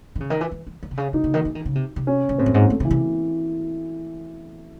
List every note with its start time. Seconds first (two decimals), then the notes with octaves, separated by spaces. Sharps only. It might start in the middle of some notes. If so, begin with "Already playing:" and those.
0.15 D#3
0.20 C#3
0.30 D#3
0.41 E3
0.51 E3
0.67 E3
0.83 D#3
0.91 C3
0.97 C#3
1.13 C3 D#4
1.24 C#3
1.34 D#3
1.45 E3
1.55 D#3
1.66 C#3
1.75 C3
1.96 C3
2.07 C#4
2.29 C3
2.38 A2 C4
2.46 F#2
2.54 G#2
2.69 G#2 A3
2.80 C3
2.85 E3
2.91 C3